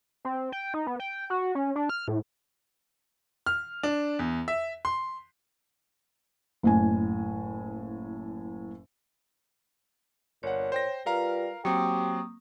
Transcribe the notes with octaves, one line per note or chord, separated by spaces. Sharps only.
C4
G5
D#4
B3
G5
F#4
C#4
D4
F6
A2
F6
D4
E2
E5
C6
F#1 A2 G#5
G1 A#2 C#5 F#5
C5 G5 A#6
G3 F4 A#4 B4 F5 A#5
F#3 A#3 C4 G4 C#6 D#6